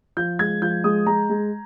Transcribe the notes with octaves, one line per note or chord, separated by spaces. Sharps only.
F3 G6
G#3 G#6
F3 G6
G#3 D#6
G#3 A#5
G#3